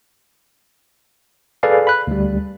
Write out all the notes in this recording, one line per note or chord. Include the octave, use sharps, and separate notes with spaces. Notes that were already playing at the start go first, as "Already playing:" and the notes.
G#4 A4 B4 D5 F5 G#5
B5 F#6
D2 G3